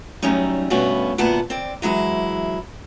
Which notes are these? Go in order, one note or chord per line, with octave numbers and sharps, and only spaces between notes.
F#3 G3 A3 C#4 D#4
G2 B2 A3 B3 C#4 F#4
D2 A#2 B3 F#5 A5
C4 D5
E3 F#3 G#3 E4